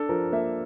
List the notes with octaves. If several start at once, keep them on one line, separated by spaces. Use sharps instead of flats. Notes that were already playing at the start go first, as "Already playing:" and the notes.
Already playing: D4 A4
F3 A#4
A#3 E5